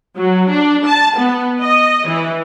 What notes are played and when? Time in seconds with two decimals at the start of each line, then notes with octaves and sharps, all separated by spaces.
0.17 F#3
0.50 D4
0.86 A5
1.17 B3
1.61 D#5
2.07 E3